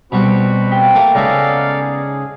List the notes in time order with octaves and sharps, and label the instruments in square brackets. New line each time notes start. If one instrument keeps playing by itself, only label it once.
[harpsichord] B2 G3 [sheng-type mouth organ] C4 F#4 B5
[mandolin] G4 F5
[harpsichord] A3 A#3 A5
[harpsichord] C#3 G#3 A#5 [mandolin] B3 D#4 [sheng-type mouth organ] A4 D5 F5
[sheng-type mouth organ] G#4